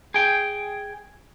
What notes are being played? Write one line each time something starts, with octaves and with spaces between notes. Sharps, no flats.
G#4 G5